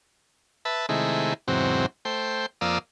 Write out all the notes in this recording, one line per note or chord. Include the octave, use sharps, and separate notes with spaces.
B4 E5 A5
C3 D#3 G#3 A3 E4
E2 G#2 C3 F#3 C4
A3 C5 G5
F2 A#3 D5 F5 D#6 E6